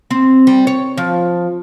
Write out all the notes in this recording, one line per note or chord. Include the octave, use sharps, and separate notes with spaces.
C4
G3
C#5
F3